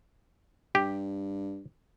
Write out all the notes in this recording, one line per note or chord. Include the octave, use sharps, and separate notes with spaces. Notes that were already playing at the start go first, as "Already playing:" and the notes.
G2 G4